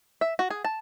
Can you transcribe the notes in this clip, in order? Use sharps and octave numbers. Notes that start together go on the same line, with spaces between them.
E5
F#4
G#4
A5